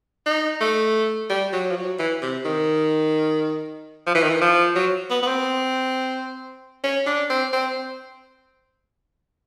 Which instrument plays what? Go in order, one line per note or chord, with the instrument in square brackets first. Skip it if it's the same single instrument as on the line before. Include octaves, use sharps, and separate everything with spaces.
[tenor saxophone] D#4
A3
G3
F#3
F3
F#3
E3
C3
D#3
F3
E3
D#3
E3
F3
F#3
B3
B3
C4
C#4
D4
C4
C4